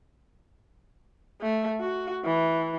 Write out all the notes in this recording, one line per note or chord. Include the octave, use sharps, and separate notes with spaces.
A3
F#4
E3